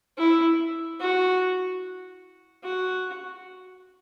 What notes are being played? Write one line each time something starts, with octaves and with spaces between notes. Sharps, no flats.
E4
F#4
F#4